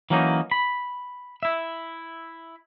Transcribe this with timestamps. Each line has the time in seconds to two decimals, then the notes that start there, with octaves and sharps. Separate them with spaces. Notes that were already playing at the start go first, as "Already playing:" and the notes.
0.10 E3 F#3 A#3 C#4 D#4
0.51 B5
1.43 E4 E5